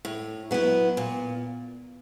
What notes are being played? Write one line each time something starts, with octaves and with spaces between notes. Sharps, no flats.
A2
F#3 B3 E4
A#2